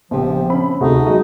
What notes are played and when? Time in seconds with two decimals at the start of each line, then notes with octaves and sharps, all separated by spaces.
0.11 A#1 C#3 F3 B3 G4
0.50 C4 C#4 B5
0.81 D2 C3 A3 D#4 F#4 G#4
1.06 F#3 G#3 F#4 D#5